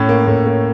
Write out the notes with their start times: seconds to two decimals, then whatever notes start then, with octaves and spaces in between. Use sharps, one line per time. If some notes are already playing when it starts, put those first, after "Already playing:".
Already playing: A2 C#4
0.09 A#3
0.27 A2 A3
0.46 A#3